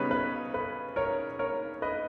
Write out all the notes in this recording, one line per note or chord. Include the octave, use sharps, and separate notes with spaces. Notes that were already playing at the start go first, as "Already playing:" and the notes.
Already playing: C#3 G3 B3 D#4 B4 C#5
B4
B4
A#4 C#5
A#4 C#5
B4 D#5